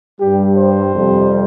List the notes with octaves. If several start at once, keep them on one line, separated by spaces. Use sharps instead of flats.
G2 G3 G4
C5
F2 C3 G3